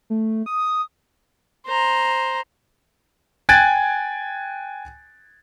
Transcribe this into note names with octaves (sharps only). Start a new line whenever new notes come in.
A3
D#6
C5 A#5
G5 G#5 F#6 G#6 A6 D7